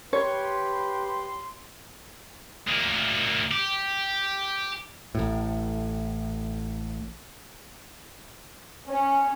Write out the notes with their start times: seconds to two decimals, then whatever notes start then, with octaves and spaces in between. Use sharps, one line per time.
0.13 G4 B4 C#5 C6
2.68 D2 A#3
3.51 G4
5.15 A1 A2
8.89 C#4